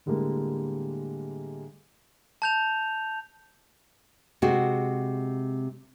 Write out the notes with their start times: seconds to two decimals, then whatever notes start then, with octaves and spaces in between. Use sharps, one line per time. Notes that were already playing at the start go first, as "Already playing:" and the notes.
0.06 A2 D3 G3 G#3 A#3
2.42 A5 G6 F7
4.42 C3 G#3 F#4